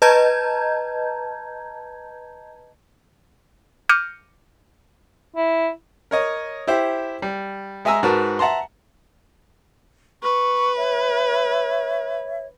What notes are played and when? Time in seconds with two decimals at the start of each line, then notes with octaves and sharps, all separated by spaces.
0.02 B4 D#5 A5 A#5 G6 G#6
3.89 D6 F6 G6 A#6 C#7 D#7
5.36 E4
6.11 A#4 C#5 D#5
6.67 E4 G4 C5 E5
7.22 G3
7.85 G#3 E5 G#5 A#5 E6
8.03 G#2 F#4 A#4 B4 A5
8.39 E5 F#5 A5 A#5 C6
10.23 B4 C#6
10.76 C#5 E5